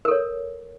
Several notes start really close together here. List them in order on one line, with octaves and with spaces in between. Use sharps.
A#4 A4 C#5